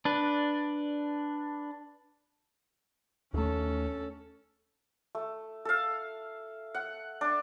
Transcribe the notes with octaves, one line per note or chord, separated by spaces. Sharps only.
D4 B4
D#2 A3 C#4 A4
A3
A4 F5
F#5
D4